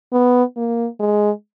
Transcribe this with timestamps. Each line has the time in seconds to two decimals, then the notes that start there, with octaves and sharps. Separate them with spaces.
0.13 B3
0.57 A#3
1.00 G#3